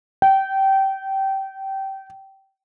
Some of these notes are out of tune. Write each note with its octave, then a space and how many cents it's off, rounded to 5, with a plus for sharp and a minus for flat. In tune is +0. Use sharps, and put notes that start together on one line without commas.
G5 -20